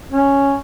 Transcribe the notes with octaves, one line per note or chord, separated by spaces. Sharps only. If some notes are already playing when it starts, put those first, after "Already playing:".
C#4